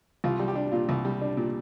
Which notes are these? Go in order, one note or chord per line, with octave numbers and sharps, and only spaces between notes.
C2 F4
G3
G4
D4
A#2 F4
C2
G3
D4
A#2